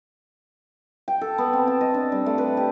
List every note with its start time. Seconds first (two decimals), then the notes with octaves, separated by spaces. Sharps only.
1.08 G5
1.21 A4
1.38 B3
1.53 C4
1.68 A5
1.81 D#5
1.94 D4
2.12 G3
2.26 A3
2.38 B4
2.57 G4